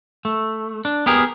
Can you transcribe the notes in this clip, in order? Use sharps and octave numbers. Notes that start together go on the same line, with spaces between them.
A3
D4
B3 G4 G#4 A#4